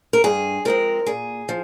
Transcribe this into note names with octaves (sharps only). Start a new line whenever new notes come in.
A#4
G2 G#4
F3 G#3 C4 A#4
A#2 G#4
F3